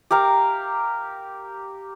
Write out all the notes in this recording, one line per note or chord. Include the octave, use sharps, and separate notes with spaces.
G4 A#4 F5 A#5